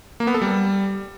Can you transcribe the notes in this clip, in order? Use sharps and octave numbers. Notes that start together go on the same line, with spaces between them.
A#3
B3
A4
G3